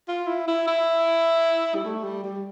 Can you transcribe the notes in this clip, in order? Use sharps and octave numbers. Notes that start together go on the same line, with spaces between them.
F4
E4
E4
E4
G3
A3
G3
G3